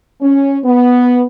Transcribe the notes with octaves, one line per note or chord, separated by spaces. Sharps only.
C#4
B3